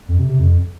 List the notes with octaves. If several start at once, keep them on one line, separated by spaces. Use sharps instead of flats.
F2
C3
C3
F2